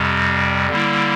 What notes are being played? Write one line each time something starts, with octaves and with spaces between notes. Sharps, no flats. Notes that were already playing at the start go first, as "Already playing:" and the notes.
Already playing: F2 C3 G3
D3 G3 A#3 E4